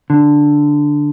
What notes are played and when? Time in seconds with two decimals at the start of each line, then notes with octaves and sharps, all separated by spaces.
0.10 D3